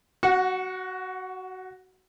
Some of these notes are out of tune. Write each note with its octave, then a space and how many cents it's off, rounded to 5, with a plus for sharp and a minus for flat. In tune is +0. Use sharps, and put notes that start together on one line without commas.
F#4 +15 F#5 -20